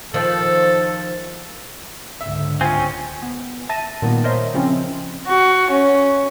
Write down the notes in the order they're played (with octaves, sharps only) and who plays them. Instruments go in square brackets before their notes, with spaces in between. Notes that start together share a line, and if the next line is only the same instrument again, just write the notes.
[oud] D#3 F3 [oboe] A4
[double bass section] C#2 G#2 D3 [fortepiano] E5
[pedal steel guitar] C4 C#4 [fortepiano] F4 [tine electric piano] G#5
[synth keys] B3
E5 A5 A6 A#6 D#7
A#2 D#3 G3 B3
A#4 C5 C#5 D#5 E5 C6
C#3 F3 C4 C#4 E4 F4
[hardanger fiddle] F#4
C#4